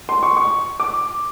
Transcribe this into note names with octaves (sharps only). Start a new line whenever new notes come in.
C6
C#6
C#6
D6